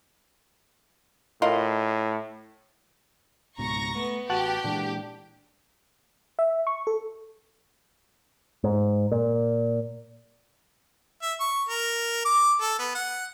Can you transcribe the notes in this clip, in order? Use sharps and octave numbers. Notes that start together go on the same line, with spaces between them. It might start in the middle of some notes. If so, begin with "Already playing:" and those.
A2 F4 A#4 D#5
C#2 G#2 B2 A#5 C#6 A#6
A3 B3
A1 F#4 G4 A5 F#6
A#2 E3 G#3 D4
E5
C#6
A4
G#2
A#2
E5
C#6
A#4
D6
A4
B3
F#5